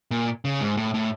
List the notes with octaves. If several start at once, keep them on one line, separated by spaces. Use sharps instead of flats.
A#2
C#3
G#2
A2
A2